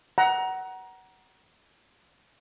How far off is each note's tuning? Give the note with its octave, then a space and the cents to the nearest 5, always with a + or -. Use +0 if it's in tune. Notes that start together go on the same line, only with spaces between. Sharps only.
F#5 +20 A#5 +20